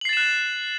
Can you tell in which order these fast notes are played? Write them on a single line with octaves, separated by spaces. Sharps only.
F#7 C7 A6 E7 F#6